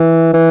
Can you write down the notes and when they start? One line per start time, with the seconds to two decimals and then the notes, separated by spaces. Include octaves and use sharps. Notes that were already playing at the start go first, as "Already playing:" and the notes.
Already playing: E3
0.34 E3